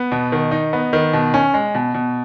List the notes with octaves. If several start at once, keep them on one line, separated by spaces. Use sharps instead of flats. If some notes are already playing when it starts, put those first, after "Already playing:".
Already playing: B3
B2
D#3
D#4
B3
D#3
B2
C#4
G#3
B2
B2